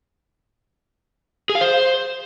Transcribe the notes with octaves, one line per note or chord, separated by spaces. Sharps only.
G#4
F5
C5